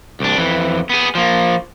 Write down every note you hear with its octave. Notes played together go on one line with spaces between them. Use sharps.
C2 D4
F2 E3
B3 G#4
F3 A#3